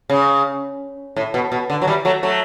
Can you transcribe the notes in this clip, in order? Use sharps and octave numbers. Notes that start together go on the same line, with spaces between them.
C#3
A2
B2
B2
D3
F#3
E3 G3
F#3 A3
F#3 A3